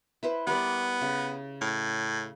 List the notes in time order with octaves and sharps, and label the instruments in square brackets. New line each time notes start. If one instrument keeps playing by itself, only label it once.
[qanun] E4 B4 C5
[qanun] G3 A#4 D5 [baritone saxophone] B3
[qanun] C#3
[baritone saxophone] A2